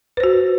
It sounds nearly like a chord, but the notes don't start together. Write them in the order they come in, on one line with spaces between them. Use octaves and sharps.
B4 C5 F#4